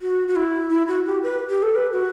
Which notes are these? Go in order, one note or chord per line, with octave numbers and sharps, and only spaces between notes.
F#4
F#4
E4
E4
F#4
G4
B4
G4
A4
B4
F#4